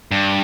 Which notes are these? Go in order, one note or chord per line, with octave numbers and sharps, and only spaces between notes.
G2